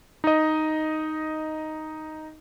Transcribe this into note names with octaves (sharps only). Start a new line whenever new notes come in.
D#4 D#5